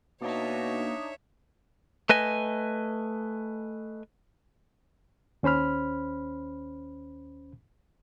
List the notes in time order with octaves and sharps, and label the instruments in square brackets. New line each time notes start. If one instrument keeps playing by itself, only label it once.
[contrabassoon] B2 [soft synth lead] A#3 [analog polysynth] D4 D#4 [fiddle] C#5 E5
[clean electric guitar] A3 B4 D#5 G#5
[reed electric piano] D#2 C#4 C5 B5 F6